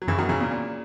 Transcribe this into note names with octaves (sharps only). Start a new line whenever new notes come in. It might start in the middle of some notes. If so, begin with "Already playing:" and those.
F#3
F#2 C#3 E3
D#3 F#3
C#3 E3
A#2 C#3
A#2